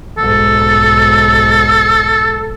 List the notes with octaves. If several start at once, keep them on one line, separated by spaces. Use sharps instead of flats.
B1 G#2 A4